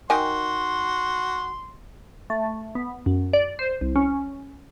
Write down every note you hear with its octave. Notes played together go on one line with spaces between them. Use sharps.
D#3 F#4 A#4 G#5 C6
A3
B3
F#2
D5
C5
C2
C#4